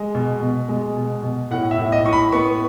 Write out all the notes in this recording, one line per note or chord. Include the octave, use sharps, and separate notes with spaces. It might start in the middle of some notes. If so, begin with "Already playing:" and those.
Already playing: G#3
B2
B2
G#3
B2
B2
A2 F#5
E5
A2
D#5
A2 C#6
B5
B3 C#6